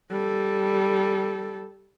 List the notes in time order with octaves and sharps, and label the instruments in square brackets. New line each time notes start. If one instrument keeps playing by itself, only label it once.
[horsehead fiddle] G3 A4